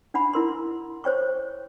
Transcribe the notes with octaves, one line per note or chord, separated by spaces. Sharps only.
D4 F#5 B5
E4 A#4 C6
C5 C#5 G5 C#6